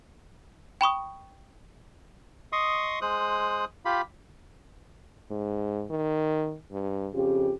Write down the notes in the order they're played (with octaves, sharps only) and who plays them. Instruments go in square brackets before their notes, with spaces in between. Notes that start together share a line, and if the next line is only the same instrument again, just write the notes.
[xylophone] G5 B5 C#6 D#6
[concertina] D#5 C6 C#6 D#6
G#3 C5 D#6 F#6
F4 G4 B5
[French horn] G#2
D#3
G2
[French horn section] F2 C#3 G4 [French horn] F4